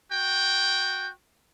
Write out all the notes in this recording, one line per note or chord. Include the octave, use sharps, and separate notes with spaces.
F#4 G5